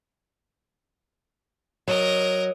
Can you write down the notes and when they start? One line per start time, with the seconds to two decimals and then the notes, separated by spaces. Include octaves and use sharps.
1.88 F#3 A#4 D#5